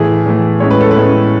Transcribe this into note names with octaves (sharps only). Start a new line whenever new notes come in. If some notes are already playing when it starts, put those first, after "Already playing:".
Already playing: A2 E3 A3 G#4
A2 E3 A3
A2 G#3 C#4 C#5
B4
A4
B4
A2 G#3 C#4